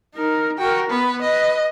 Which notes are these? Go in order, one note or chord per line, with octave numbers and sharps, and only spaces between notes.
D#4 A#4
F#4 A#4 G5
B3 B4
B4 D#5